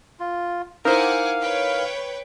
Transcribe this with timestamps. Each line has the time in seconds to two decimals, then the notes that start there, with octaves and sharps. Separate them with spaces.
0.20 F4
0.85 D#4 E4 A#4 C5 F5 F#5 G#5 D6
1.42 B4 C#5 G5